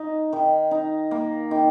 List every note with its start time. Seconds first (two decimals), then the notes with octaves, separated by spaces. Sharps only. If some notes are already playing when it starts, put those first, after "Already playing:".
Already playing: D#4
0.33 D#3
0.71 D#4
1.11 A#3
1.51 D#3